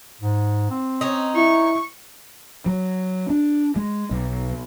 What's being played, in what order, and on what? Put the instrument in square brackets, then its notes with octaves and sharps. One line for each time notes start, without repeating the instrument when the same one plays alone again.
[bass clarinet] G#2
C4
[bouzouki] C#4 D#4
[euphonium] E4 [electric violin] C#6
[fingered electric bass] F#3
D4
G#3
B1